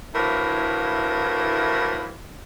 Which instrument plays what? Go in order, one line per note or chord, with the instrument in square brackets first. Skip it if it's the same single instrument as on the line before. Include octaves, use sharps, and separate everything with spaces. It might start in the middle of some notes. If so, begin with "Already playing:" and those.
[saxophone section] D2 A2 E3 F3 E4 A#4